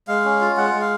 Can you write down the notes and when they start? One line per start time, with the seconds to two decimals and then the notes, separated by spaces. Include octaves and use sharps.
0.08 G#3 F5
0.25 C#4
0.41 F4
0.57 G#3 F#5
0.74 G#3
0.82 F5